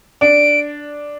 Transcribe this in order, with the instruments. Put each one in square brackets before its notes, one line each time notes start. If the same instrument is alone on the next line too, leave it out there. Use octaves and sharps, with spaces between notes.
[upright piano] D4 [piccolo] D7